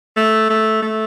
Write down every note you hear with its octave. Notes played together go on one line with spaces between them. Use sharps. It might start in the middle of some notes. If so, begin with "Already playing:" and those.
A3
A3
A3